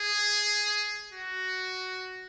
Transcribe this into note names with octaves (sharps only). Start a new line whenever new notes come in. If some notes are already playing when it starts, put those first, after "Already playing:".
Already playing: G#4
F#4